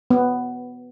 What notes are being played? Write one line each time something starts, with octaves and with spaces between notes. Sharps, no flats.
B3